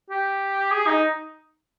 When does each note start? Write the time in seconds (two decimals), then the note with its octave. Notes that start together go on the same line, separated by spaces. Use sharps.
0.10 G4
0.71 G#4
0.87 D#4